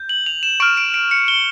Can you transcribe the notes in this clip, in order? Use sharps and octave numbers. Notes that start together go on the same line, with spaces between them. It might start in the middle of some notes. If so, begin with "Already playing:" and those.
Already playing: G6
F#7
F7
E7
C#6 F6 D7
D7
D7
C#7
G7